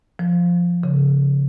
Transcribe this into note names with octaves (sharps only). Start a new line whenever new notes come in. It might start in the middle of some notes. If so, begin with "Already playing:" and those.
F3
C#3